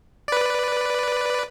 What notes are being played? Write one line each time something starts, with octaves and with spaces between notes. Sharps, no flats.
B4 D5